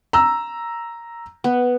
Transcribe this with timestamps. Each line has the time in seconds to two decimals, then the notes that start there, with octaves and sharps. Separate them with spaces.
0.13 A#5 E6
1.44 B3